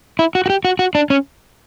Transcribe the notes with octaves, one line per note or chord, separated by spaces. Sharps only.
E4
F#4
F#4
G4
F#4
F#4
D4
C#4